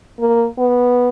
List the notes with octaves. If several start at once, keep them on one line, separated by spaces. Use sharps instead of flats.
A#3
B3